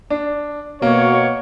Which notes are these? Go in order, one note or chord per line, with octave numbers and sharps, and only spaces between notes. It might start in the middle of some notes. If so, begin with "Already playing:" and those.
D4
B2 A#3 F#4 C#5